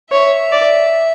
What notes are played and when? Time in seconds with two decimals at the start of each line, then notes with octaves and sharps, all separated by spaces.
0.12 C#5 E5
0.52 D5